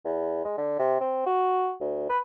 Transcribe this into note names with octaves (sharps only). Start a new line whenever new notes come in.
E2
G#3
D3
C3
C4
F#4
D2
B4